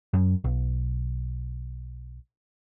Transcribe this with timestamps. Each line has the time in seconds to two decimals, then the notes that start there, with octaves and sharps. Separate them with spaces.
0.14 F#2
0.44 B1